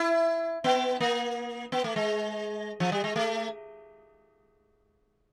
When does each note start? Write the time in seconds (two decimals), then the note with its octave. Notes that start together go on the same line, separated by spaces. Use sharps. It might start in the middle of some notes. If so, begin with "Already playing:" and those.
Already playing: E4
0.64 B3
1.00 A#3
1.72 B3
1.84 A3
1.96 G#3
2.80 F3
2.92 G3
3.04 G#3
3.16 A3